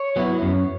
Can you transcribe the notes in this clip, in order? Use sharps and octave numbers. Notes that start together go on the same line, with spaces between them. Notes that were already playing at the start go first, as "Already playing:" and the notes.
Already playing: C#5
F#3 B3 E4
F#2